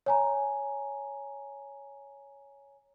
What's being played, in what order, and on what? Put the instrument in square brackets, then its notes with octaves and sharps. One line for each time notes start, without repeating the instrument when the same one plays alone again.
[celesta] C#5 G#5 A#5